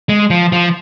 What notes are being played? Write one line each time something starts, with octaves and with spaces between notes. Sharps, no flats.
G#3
F3
F3